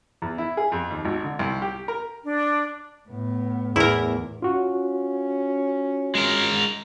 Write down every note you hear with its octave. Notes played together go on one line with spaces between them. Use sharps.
E2
E4
G#4
F2
D#2
G#1
D3
C2
G4
A#4
D4
A2 B3
E2 A2 E4 A#4
C#4 F4 F#4
G#3 A#4